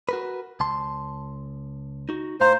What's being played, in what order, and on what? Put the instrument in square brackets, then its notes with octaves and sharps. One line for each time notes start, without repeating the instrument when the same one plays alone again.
[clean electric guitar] F#4 A#4 B4
C#2 A5 C6
D#4 F#4
[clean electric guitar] A2 F5 A#5 [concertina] C5